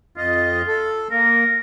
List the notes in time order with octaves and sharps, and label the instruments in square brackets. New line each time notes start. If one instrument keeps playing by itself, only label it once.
[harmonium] F2 D#5 [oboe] F4
[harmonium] A4
[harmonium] A#3 [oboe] A#4